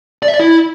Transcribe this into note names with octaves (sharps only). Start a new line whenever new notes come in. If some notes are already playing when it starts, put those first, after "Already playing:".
D5
E5
D5
E4